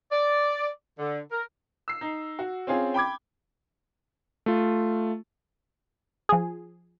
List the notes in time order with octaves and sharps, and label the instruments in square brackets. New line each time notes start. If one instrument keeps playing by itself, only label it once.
[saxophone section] D5
D3
A#4
[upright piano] E6 C7
D#4
F#4
C4 C#4 F4 G#4
G5 B5 D6 G#6
[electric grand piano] A3 F4
[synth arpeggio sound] F3 G#4